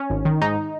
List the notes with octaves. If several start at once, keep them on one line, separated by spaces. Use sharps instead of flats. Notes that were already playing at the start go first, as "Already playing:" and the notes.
Already playing: C#4
G#1
D#3
G#2 D#4